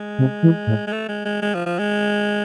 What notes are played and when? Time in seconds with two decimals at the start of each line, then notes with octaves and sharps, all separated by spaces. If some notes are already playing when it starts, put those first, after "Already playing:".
Already playing: G#3
0.18 C3
0.43 E3
0.67 A2
0.87 G#3
0.92 A3
1.09 G#3
1.25 G#3
1.42 G#3
1.55 F3
1.66 F3
1.79 G#3